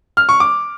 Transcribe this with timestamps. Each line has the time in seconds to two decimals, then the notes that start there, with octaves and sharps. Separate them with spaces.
0.17 F6
0.29 C#6
0.40 D6